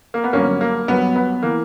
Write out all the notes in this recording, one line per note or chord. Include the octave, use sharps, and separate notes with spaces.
A#3
B3
G2 D3 F#3 A#3 C#4
A#3
G2 F#3 B3
B3
E3 A#3